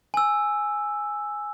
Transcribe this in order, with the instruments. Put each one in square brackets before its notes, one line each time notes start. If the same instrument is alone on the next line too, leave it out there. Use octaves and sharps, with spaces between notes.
[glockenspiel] G#5 E6